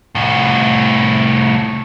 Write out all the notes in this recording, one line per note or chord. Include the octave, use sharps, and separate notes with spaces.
C2 A2